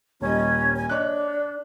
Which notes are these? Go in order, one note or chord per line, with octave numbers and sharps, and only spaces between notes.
D#1 G3 C#4 D#5
G#5
D4 C#5 D#5 F#6